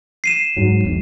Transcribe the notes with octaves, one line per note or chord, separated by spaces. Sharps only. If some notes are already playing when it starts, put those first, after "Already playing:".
C7 D#7 E7
G#2 F#3
E1 B1